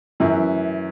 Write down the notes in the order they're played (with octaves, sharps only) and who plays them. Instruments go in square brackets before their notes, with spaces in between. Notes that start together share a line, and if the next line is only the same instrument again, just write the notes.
[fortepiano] F#2 E3 E4